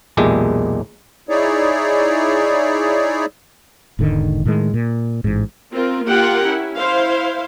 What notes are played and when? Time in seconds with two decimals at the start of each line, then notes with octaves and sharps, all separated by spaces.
0.17 B1 E2 A#2 G#3 G4 E5
1.29 D#4 E4 G#4 C#5 D5
3.99 E1 G#2 D3 D#3
4.45 A2 D#3 F#3 G#3
4.74 A#2
5.24 A1 G#2
5.72 C4 F4 A#4
6.06 A#3 F4 G4 A#4 F#5 G5
6.45 C#4 E4
6.79 E4 C5 F5